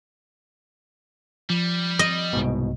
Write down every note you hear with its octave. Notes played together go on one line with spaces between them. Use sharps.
F3 G3
D#5
C2 G#2 B2